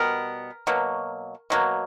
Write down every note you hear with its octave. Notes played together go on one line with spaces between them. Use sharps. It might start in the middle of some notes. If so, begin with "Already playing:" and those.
Already playing: B2 G3 B3 A#4
B2 F#3 A#3
B2 F#3 A#3